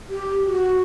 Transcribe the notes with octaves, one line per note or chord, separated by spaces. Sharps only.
G4
F#4